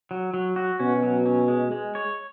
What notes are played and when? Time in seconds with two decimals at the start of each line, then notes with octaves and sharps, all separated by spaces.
0.11 F#3
0.34 F#3
0.56 F#4
0.79 B2 C#4
1.03 F#3
1.26 C#4
1.48 G#3
1.72 G#3
1.95 C#5